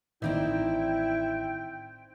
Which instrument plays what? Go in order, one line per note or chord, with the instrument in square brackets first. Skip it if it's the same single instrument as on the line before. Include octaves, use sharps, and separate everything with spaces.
[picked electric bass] A1 D#3 [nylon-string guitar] C4 D#4 D5 [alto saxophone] E4 [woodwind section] G5